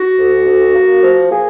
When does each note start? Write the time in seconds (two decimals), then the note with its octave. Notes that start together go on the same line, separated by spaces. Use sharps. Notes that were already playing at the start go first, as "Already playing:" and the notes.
Already playing: F#4
0.18 D2
0.46 D2
0.75 A#3
1.03 F3
1.31 A#3 G#4